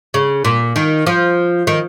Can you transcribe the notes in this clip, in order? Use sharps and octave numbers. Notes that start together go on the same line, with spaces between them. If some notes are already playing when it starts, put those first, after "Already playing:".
C#3
A#2
D#3
F3
D#3